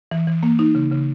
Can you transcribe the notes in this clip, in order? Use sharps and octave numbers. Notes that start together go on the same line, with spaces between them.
E3
E3
A#3
D#4
C#3
C#3